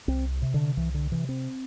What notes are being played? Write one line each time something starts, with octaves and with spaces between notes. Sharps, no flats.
C2 C4
C3
D3
C2 E3
D3
C3 E3
C4